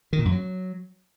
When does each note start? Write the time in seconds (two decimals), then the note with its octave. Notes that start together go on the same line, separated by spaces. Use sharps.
0.13 D#3
0.19 A#2
0.25 F#2
0.32 F#3